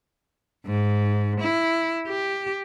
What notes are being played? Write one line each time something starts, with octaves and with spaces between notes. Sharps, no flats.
G#2
E4
G4